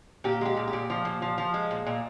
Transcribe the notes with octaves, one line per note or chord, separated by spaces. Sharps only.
A#2 G4
G#3 G4
A#2
G4
A#2
F3
A#2
F3
F3
G#3
A#2
A#2